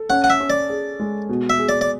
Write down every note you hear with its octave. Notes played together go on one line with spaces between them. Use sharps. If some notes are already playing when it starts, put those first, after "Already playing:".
Already playing: A4
C#4 F#5
F#5
E5
C#4
D5
G#4
G#3
B2
E5
G#4
D5
D5